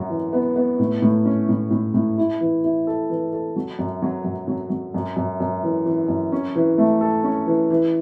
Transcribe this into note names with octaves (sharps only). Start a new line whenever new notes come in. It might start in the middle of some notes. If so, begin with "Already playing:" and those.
Already playing: F#2 F#4
E3
B3
B3
A2
A2
C#4
A2
A2
A2
E4
E3
E4
A4
E3
A4
F#3
F#2
F#3
F#2
F#3
F#3
F#2
F#2
F#2
E3
E3
F#2
C#4
E3
A3
A4
C#4
E3
E3